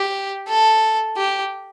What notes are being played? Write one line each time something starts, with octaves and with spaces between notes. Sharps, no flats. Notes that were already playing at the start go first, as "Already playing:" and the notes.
Already playing: G4
A4
G4